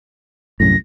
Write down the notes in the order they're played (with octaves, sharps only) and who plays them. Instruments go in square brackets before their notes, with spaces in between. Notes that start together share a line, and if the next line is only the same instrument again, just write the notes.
[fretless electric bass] C2 F#2 A2 [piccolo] A#6